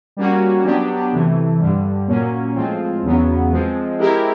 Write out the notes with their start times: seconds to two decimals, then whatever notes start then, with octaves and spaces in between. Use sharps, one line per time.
0.17 G3 A#3 C#4 F#4
0.65 F#3 B3 D4 G4
1.13 C3 E3 A3
1.60 G2 D3 G3
2.08 A#2 F#3 A#3 C#4
2.55 A2 F3 G#3 C4 F4
3.03 E2 C#3 F#3 B3
3.51 F3 G#3 C4
3.99 G#3 C4 E4 G4 A#4